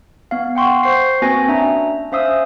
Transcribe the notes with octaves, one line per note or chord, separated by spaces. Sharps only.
B3 F5
F#5 G5 C6 C#6
C5 C#6 C7
A#3 C4 F#4 B4 G#5 A#6
C#4 D4 E5 A#5
C#4 C5 E5 F5 D#6 E6